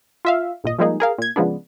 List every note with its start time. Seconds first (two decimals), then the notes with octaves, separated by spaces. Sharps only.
0.25 F4 E5 F5
0.64 G#1 A#2 D#5
0.79 F3 G3 G#3 A#3 D#4 G#4
1.00 G#4 A#4 F5
1.18 A#2 G#6
1.36 C#3 F3 G#3 B3 D4